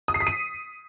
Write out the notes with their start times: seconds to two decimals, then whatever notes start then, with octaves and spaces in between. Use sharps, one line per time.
0.08 D#6
0.14 C7
0.20 B6
0.27 D#7